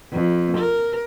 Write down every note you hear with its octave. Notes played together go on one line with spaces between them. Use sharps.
F2
A#4